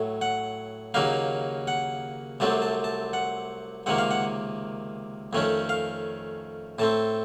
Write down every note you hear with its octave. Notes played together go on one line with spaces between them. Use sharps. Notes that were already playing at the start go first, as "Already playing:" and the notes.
Already playing: A2 F#3 A3
F#5
D#2 C#3 F#3 A#3 D#4 F5
F#5
C2 C3 F#3 A3 C4 A5
A5
A5
F#5
C#2 C3 D#3 A#3 F#5
F5
F#5
F2 D#3 A3 C#4
F5
A2 A3 C4 A5